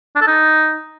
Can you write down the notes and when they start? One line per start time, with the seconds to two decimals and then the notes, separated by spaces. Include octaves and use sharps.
0.16 D4
0.21 A4
0.27 D#4